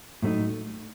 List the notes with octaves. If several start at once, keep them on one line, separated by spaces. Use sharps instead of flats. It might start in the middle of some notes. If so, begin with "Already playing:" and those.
A2 F#3 A3 C4 D#4